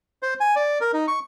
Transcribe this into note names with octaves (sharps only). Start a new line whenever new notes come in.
C5
G#5
D5
A#4
D#4
C#6